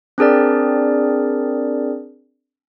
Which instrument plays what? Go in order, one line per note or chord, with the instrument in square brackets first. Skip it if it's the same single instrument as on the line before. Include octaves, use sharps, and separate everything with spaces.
[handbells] C4 D4 G#4 A#4 D5